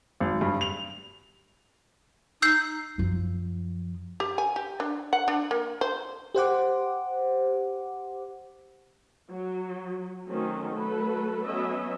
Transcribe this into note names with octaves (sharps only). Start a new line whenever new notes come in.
G#1
G2
F7
D#4 E6 G6 C7
F#2 F3
G4
G#5
G4
D4
F#5
D4
A#3
C5
G4 C5 F#5 D6
F#3
D#3 F#3 A3 C4 C#4
F#3 A3 A4 B4
F#3 B3 C#4 D#5 E5